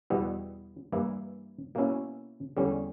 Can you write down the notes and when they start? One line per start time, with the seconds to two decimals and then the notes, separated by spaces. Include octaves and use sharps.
0.10 E2 B2 G3 B3 E4
0.92 G2 E3 A#3 E4
1.75 B2 A#3 C#4 E4
2.57 E2 D3 G3 C#4